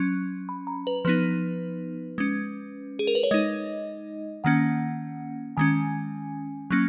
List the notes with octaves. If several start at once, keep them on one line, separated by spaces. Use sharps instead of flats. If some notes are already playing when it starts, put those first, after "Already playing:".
Already playing: F#3 C#4
B5
A#5
B4
F3 B3 D#4 B4
G#3 C#4
G#4
A#4
B4
C#5
G#3 D#4 D#5
D#3 A#3 C#4 F#5
D#3 G#3 C#4 G#5
F#3 A#3 C#4